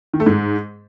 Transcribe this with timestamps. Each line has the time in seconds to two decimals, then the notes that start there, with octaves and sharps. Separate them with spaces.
0.13 D#3
0.20 A3
0.26 G#2